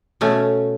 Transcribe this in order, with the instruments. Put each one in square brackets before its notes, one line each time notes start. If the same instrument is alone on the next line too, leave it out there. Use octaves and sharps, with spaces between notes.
[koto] B2 A3 C#4